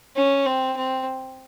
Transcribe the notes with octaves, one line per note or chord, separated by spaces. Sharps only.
C#4
C4
C4